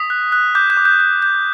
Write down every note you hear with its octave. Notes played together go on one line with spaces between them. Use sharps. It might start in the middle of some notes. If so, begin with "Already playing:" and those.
Already playing: D#6 B6
F#6
F#6
D6 G6
G6
D6
G6
G6
G6